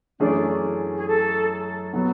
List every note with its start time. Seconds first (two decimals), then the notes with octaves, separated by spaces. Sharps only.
0.20 F#2 E3 A3 C#4 D4 G#4
0.96 G#4
1.07 A4
1.93 B2 F#3 B3